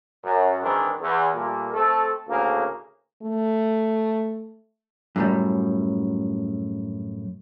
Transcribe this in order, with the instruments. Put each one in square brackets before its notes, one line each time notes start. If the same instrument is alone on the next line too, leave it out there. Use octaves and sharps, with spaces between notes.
[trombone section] F#2
G#2 D#3 E3 C4 D4
E2
A#2 G3 A3 A#3
A3 C4 A4
D2 A2 C#3 A#3
[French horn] A3
[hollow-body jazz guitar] F#2 A2 G3